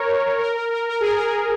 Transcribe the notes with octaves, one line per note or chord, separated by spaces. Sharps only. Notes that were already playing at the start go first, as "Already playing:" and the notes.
Already playing: A#4 C#5
A#4
A#4
A#4
A#4
G#4
A#4
A#4
G#4